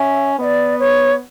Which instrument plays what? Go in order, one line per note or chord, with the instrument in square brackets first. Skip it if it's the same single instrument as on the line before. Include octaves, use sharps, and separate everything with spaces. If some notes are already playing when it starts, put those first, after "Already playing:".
Already playing: [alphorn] C#4 [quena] E5
[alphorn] B3 [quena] D#5
[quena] D5
C#5